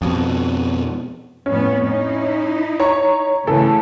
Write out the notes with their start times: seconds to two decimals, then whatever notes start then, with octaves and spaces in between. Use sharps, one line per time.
0.02 F2 B2
1.46 F2 A2 B3 C#4
1.89 D#4 E4
2.80 C#5 A#5 C#6
3.47 C#3 E3 A3 A4